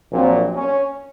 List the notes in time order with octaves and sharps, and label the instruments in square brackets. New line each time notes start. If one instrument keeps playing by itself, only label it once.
[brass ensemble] A#1 A#2 F#3 C4
C#4